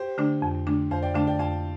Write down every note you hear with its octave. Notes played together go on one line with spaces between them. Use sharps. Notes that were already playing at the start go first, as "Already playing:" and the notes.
Already playing: G4 C5
D3 A3 D4
F2
D3 A3 D4
F2 C5 F5
D5 G5
D3 A3 D4 F5 A5
D5 G5
F2 F5 A5